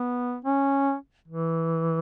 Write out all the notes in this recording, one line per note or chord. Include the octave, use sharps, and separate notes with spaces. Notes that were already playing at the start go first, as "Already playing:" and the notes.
Already playing: B3
C#4
E3